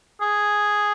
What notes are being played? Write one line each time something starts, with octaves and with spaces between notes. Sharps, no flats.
G#4